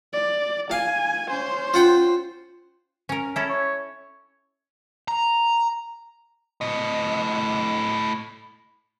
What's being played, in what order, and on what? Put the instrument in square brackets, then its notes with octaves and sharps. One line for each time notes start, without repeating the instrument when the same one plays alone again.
[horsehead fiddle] D5
[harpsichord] F5 [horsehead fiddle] G#5
[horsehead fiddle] C#4 C5
[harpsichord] F4 F#5 G5
[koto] C#4 A#4
[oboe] C#4 [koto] E4 A4
[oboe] C#5
[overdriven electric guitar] A#5
[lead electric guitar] A2 D#5